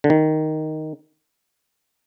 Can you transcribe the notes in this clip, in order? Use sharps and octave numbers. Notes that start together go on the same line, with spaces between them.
D3
D#3